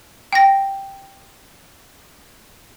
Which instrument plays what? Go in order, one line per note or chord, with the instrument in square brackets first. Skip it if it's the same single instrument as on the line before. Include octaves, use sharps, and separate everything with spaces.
[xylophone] G5 A#6